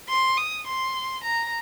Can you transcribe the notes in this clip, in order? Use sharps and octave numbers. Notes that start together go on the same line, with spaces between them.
C6
D#6
C6
A#5